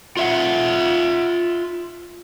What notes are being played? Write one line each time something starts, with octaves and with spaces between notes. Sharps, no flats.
F4 E5 F#5